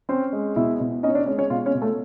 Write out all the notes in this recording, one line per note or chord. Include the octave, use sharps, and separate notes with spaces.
C4 C#4 C5
G#3
B2 E4 E5
B2
C#4 D#4 D#5
C#5
D4 D5
G#3 C#4 C#5
C#4 C#5
B2 F4 F5
C#4 C#5
B2
A3 A4